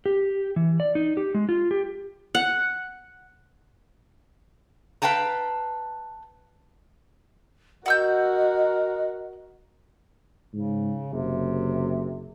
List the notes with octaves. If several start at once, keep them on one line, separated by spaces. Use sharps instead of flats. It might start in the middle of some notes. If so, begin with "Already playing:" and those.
G4
E3
D5
D#4
G4
G#3
F4
G4
F#5
B4 F5 G5 A5 A#5
F#4 A#4 D#5 F#5 E6 G6
G#2 C#3
F#1 C3